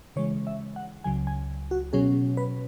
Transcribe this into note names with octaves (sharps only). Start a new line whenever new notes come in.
C#3 E3 G#3 C#5
E5
F#5
C#2 C#3 F#3 G#5
G#5
F#4
B2 F#3 C#4 G#4
B4